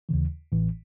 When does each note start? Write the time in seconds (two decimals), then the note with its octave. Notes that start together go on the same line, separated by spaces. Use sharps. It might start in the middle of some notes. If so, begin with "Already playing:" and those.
0.09 D#2 C#3 E3
0.52 A1 A2 E3